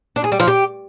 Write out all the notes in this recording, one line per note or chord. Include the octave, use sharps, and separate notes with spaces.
D4
G#4
G3
F3
G4